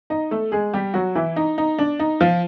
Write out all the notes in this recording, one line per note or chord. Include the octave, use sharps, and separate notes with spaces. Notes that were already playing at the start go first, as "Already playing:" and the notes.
D#4 D#5
A3 A4
G#3 G#4
G3 G4
F#3 F#4
E3 E4
D#4
D#4
D4
D#4
F3 F4